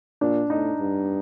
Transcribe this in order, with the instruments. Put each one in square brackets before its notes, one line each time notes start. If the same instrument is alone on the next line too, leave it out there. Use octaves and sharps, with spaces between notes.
[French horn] A#2 [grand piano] D4
[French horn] A2 [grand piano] D#4
[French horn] G2